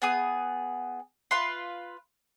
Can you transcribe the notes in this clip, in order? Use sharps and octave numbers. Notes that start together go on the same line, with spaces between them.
B3 G#4 D#6
F4 B4 C6